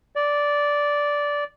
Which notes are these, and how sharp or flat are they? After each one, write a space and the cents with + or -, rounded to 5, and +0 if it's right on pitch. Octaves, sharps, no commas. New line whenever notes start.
D5 -10